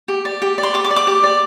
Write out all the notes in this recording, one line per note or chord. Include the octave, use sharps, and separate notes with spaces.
G4
D5
G4
D5
C6
G4 D6
D6
D5
D6
G4
D5